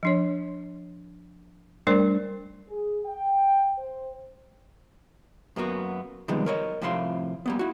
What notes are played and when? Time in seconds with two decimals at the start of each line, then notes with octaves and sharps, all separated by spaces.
0.03 F3 D4 C#5
1.87 G3 A3 D4 A#4 C5 D5
2.69 G#4
3.05 G5
3.78 C5
5.56 F#2 A#3 B3 F#4
6.28 C3 D#3 F3 G3 G#3 B3
6.46 A#4 C#5 D#5
6.82 A2 C3 F3 E5 F5 C6
7.46 G3 A#3 B3
7.59 E4 F#4